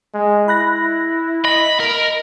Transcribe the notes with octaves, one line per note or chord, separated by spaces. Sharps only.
G#3
E4 B5 F#6 A#6
D#5 B5 A#6
A#4